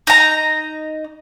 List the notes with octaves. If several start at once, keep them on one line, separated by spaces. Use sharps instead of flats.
D#4 A#5